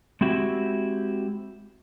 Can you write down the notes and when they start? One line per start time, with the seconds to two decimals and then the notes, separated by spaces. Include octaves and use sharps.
0.21 G#3 C4 E4 F#4 G4